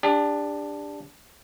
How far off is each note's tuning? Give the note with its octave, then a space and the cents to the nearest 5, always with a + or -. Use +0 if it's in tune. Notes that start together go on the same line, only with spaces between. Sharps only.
D4 +0 G4 +40